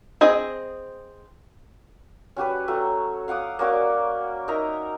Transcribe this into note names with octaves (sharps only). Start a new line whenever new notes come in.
C4 G#4 D#5
C#4 F#4 G4 B4
F#3 A3 A#5
F5 F#5 D6 D#6
A#3 C#4 F#4 D5
D#4 A#4 E5 A#5